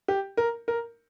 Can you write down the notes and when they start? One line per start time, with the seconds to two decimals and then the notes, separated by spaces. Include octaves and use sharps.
0.08 G4
0.37 A#4
0.68 A#4